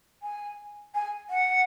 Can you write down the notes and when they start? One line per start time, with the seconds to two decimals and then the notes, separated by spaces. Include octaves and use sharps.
0.23 G#5
0.95 G#5
1.30 F#5